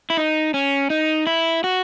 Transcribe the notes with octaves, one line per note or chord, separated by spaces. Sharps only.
E4
D#4
C#4
D#4
E4
F#4